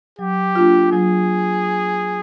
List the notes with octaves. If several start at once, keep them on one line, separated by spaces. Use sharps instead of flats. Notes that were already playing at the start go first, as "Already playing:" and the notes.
F#3 G4
A#3 D4 F4
F#3 G#4